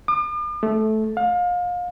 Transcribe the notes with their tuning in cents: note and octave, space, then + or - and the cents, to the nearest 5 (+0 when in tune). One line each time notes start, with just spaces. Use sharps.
D6 +45
A3 -15
F5 +30